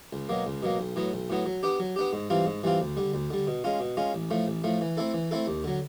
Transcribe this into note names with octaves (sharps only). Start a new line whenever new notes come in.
C#2
B2 F#3 A#3
C#2
B2 F#3 A#3
B1
A2 F#3 B3
B1
A2 F#3 B3
F#3
B3 D4 G4
F#3
B3 D4 G4
G#2
E3 G3 C4 F4
G#2
E3 G3 C4 F4
D2
D3 G3
D2
D3 G3
B2
G#3 C#4 F4
B2
G#3 C#4 F4
A1
A2 F3 A3
A1
A2 F3 A3
E3
A3 C4 E4 A4
E3
A3 C4 E4 A4
D#2
D3 F#3